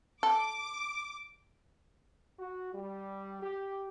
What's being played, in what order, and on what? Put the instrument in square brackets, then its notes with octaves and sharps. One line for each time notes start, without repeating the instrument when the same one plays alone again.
[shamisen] A4 [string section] D6
[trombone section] F#4
G3
G4